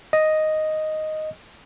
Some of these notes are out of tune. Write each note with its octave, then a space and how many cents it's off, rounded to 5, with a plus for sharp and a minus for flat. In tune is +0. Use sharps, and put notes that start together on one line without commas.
D#5 +0